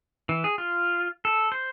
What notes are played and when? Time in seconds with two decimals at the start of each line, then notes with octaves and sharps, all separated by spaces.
0.29 E3
0.44 G#4
0.58 F4
1.25 A4
1.52 C5